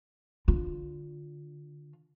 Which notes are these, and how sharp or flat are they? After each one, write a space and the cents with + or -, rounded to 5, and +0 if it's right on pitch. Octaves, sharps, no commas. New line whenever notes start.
D3 +0 F4 +15